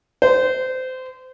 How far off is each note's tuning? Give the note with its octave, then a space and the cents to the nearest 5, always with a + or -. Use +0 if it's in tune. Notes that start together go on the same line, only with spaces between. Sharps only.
C5 -25